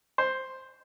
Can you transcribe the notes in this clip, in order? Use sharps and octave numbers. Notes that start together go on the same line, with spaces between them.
C5